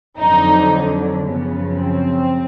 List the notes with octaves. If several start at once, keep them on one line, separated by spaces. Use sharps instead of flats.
F2 D3 F#3 D#4
F#2 C#3 F3 B3
C4